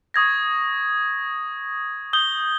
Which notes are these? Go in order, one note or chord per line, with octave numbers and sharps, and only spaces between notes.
C#6 D#6 G#6 A#6
D#6 G6 G7